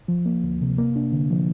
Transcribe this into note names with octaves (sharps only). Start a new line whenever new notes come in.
F3
A#3
D2
C3
A#3
D4
D3
F3